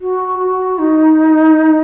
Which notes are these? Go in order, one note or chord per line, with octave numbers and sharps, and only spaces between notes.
F#4
F#4
D#4